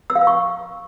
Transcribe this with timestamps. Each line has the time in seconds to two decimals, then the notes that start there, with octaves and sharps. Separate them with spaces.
0.10 E6
0.15 F5
0.21 E6
0.27 C#6